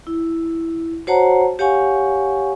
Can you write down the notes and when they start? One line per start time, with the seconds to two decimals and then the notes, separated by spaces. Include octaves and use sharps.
0.07 E4
1.07 F#4 C5 C#5 F#5 A5 A#5
1.59 G4 C#5 F5 F#5 G#5 C#6